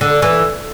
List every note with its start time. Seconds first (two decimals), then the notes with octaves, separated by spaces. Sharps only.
0.01 D3
0.22 E3